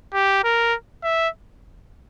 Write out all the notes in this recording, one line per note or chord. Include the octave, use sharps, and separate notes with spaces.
G4
A#4
E5